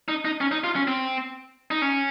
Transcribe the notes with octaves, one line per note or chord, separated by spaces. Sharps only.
D#4
D#4
C#4
D#4
F4
C#4
C4
D#4
C#4